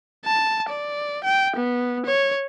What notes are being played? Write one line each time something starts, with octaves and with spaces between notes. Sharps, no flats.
A5
D5
G5
B3
C#5